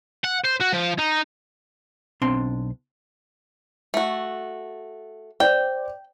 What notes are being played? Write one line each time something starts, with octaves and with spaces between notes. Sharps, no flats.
F#5
C5
F#4
F3
D#4
B1 C4 D4 C6
A3 F#4
C5 D5 G5